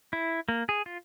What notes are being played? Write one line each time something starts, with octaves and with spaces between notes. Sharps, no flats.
E4
A#3
G#4
F4